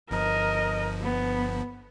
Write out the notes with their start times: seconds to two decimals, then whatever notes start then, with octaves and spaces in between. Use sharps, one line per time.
0.11 G1 G2 F3 A#4 D#5
1.02 B3